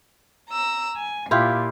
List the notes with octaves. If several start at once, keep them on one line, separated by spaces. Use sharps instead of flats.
A#5 E6
G#5
A#2 E4 F4 G4